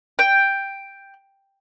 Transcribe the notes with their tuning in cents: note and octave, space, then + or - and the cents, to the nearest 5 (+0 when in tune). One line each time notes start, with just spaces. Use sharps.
G5 +5